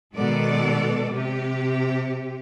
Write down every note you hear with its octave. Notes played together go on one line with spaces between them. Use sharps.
B2 D#3 G#3 B3 A4 D5
C3 G4